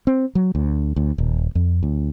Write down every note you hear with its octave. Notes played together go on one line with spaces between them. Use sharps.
C4
F#3
D2
D2
D#1
F2
D2